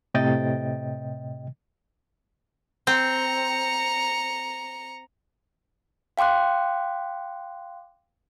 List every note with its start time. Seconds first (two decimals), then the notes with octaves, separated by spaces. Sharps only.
0.14 A2 C3 D#5 G5 A6
2.87 C4 A#5 C#7
6.18 F5 G5 C6 D6 F#6